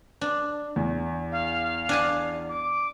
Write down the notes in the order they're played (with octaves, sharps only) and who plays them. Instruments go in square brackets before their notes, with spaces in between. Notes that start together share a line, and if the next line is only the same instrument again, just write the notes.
[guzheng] D4
[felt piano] E2
[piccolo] F5
[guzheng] D4 G#5 A5
[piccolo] D6